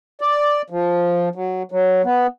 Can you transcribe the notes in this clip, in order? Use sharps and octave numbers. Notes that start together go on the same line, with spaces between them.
D5
F3
F#3
F#3
B3